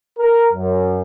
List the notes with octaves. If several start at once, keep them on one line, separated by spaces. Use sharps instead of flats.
A#4
F#2